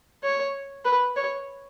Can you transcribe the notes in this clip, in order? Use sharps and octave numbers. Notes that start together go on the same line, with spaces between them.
C#5
B4
C#5